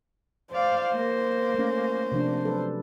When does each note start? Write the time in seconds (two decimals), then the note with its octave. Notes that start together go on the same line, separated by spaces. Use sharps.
0.53 C5 D5 F5
0.93 A#3
1.54 A3 C#4
2.12 C3 F3 D4
2.45 F#3 A4 B4